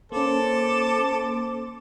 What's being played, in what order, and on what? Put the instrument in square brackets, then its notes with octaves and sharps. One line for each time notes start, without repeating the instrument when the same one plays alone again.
[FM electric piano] A#3 C#4 [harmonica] A4 [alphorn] C5 [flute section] D6